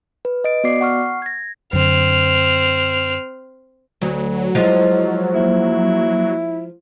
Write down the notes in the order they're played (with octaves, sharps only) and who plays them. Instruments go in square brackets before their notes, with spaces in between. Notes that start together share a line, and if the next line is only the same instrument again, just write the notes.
[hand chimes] B4
D#5 D7
B3 F#4 D5 D6 C7
F#5 C#6 F6 C7
G#6 A#6
[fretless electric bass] F#2 D3 [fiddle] C4 F6
[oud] D2 [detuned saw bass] F#3
[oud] F3 G#3 [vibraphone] E4 D#5
[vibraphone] A#3 [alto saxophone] E4